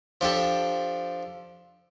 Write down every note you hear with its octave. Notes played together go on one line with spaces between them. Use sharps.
F3 D4 G4 A4